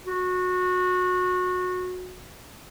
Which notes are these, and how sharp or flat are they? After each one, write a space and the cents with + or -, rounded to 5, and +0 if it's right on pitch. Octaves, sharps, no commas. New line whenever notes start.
F#4 -25